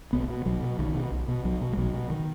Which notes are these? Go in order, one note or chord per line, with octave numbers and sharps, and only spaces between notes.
B1 B3
B2
B1 F#3
B2
B1 D#3
B2
B1
B2
B1 F#3
B2
G#3
B1 F#3
B2
D#3